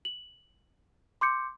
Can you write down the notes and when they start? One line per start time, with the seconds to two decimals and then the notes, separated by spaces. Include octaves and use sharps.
0.05 F#7
1.21 C6 D6 G6 C#7